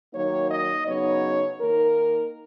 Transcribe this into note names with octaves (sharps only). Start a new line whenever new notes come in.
D#3 F#3 A#3 D#4 C#5
D#5
C#3 F#3 B3 D#4 C#5
D#3 A#3 D#4 A#4